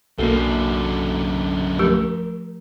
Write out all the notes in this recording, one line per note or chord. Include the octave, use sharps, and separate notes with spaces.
B1 F#2 D3 A#3 F#4 A4
F3 A3 G4 A#4